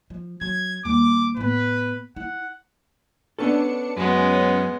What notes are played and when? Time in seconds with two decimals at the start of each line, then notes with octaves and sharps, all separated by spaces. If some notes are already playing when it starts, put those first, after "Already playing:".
0.10 F3
0.41 F#3 G#6
0.85 D#2 G3 D6
1.37 A2 B3 B4
2.16 E4 F#5
3.39 B3 C#4 D4 A4 C#7
3.97 F#2 G#3 B3 C#4